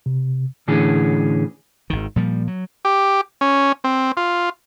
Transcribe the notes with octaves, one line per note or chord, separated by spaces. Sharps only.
C3
A2 D3 E3 C#4 G#4
G#1 D#3
A#2 F3 G3
F#3
G4
C#4
C4
F4